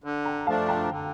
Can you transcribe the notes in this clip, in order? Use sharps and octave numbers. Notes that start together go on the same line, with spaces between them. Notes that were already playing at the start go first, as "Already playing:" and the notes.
D3
G5 A#5
F3 A3 D4 F5 A5
G5 A#5
D3